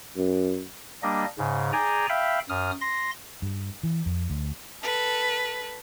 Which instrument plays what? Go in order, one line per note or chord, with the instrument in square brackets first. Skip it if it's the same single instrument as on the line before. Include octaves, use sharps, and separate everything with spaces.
[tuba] F#2
[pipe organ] G3 A#3 D4 D#5
G#2 C#3
G#4 D5 G5 G#5 A#5
E5 F5 G5 B5
F#2 D#6 F6
C6 A#6
[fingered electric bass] G2
E3
F2
D2
[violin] A4 B4